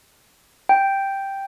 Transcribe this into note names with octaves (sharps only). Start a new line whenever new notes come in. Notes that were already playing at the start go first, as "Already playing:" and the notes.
G5